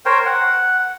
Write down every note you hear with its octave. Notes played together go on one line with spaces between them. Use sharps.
A#4 C5 C#5 G5
F#5